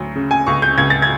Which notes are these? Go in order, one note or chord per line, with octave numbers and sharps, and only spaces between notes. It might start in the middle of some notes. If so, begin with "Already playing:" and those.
Already playing: D2 F#3
C#3
G#5
C#2 C#6
G6
C#2 G#6
A6
G#6